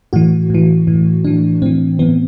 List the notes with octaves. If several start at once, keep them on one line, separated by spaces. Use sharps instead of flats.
A2 E3 F#4
A2 E3
A2 E3
A2 E3 D4
A2 E3 C4
A2 E3 B3